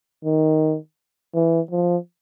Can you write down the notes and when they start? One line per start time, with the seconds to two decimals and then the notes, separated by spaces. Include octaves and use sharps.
0.25 D#3
1.35 E3
1.71 F3